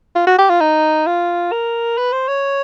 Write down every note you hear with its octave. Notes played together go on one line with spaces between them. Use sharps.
F4
F#4
G4
F4
D#4
F4
A#4
B4
C5
C#5